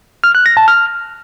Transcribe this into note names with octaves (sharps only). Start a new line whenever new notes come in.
F6
F#6
A#6
A5
F6